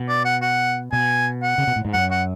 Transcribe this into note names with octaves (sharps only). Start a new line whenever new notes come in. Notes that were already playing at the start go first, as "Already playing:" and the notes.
Already playing: B2
D5
F#5
F#5
B2 G#5
F#5
C#3
B2
A2
G#2
F#2 F#5
F#5